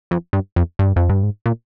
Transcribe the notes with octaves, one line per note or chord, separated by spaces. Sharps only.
F2
G2
F2
G2
F2
G2
G#2
A#2